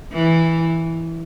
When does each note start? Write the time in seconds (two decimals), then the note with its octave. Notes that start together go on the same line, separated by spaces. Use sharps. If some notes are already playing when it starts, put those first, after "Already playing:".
0.13 E3